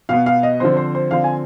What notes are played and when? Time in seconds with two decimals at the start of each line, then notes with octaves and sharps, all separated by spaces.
0.09 B2 B3 F5
0.26 F5
0.43 D#5
0.60 D3 F3 C4 C5
0.77 C5
0.95 C5
1.11 D3 F3 C4 F5
1.24 G#5